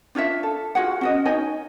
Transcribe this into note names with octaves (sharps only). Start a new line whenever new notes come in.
D4 F4 C#5 E5
A4
F4 F#4 G#4 F#5
C#4 F#4 D#5
D#4 C#5 D#5 G#5